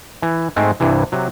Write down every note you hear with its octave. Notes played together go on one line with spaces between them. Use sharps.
E3
G#2 G#3 A3 C4
C2 G2 C3 E3
C3 F#3